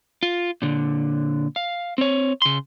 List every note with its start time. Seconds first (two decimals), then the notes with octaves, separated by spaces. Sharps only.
0.23 F4
0.62 A#2 D3
1.56 F5
1.98 C4 C#5
2.42 C#3 C6